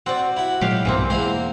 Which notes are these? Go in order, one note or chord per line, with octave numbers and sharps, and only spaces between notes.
C4 F#4 D5
E4 F#4
A#2 F#3 G#3 G4 F5
B1 G2 E3 A#3 C4
E2 G#3 A#3 C4 C5